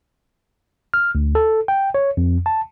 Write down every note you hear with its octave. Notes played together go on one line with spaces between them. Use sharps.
F6
D2
A4
G5
C#5
F2
A5